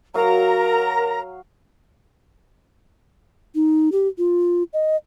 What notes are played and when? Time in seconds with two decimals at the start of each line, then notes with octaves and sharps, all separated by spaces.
0.14 F#3 A#4 F5 A#5
3.55 D#4
3.92 G4
4.18 F4
4.73 D#5